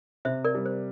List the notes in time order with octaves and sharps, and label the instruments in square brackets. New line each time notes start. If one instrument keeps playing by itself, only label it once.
[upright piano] C3 [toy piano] C5 E5
[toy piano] A#4 D5
[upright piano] G3
[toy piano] C5